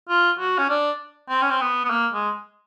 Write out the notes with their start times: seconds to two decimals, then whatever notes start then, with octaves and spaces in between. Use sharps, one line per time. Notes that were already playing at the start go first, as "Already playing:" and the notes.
0.09 F4
0.39 F#4
0.58 C#4
0.69 D4
1.30 C4
1.42 C#4
1.51 C4
1.61 B3
1.85 B3
1.90 A#3
2.14 G#3